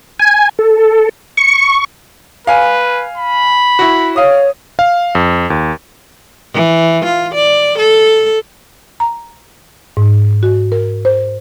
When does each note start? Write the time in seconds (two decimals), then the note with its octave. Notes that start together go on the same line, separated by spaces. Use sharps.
0.19 G#5
0.59 A4
1.37 C#6
2.47 B4 F5 G#5
3.17 B5
3.79 E4 F#4
4.16 C#5 F5 D#6
4.79 F5
5.15 F2
5.50 D#2
6.53 E3
7.04 F4
7.34 D5
7.78 A4
9.00 A#5
9.97 G#2
10.43 F#4
10.72 A#4
11.05 C5